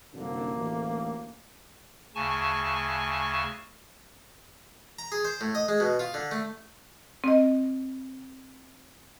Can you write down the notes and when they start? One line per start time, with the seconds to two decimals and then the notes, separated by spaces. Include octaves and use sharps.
0.14 C2 F#2 D3 A#3
0.56 A1 D2
2.15 D2 C#3 G#5 A5 C#6
4.99 A#5
5.12 G#4
5.25 C5
5.41 A2
5.55 D#5
5.68 G#3
5.80 B2
5.99 F4
6.14 D3
6.31 A3
7.24 C4 D#5